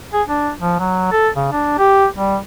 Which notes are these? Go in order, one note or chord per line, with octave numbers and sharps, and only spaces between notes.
G#4
D4
F3
F#3
A4
C#3
D4
G4
G3